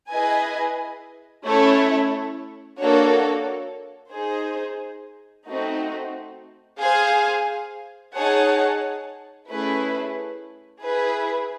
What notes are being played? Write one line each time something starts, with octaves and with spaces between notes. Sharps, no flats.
E4 G#4 B4 D#5 G#5
A3 C#4 E4 A4 C#5
A#3 D4 F#4 A4 C#5
D#4 G#4 C5
A3 C4 D#4 F#4
G#4 C5 F5 G#5
D#4 G#4 C#5 F#5 A5
A3 C#4 E4 G#4 B4
E4 G#4 B4